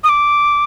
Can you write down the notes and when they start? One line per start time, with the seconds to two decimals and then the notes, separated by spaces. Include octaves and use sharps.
0.04 D#6
0.09 D6